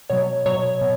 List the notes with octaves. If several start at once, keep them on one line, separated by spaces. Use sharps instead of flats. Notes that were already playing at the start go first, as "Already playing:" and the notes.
B2 F#3 C#5
B2 F#3 C#5
B2